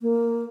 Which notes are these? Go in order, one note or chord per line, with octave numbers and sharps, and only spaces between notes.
A#3